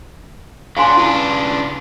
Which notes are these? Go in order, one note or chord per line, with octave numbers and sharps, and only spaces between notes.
F#3 D4 F5 G#5 C6
C#3 D4 E4 B4